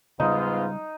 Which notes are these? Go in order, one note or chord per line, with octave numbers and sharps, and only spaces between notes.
G#2 C#3 G3 B3 D#4 F4